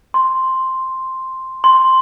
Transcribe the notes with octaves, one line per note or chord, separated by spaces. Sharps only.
C6
C6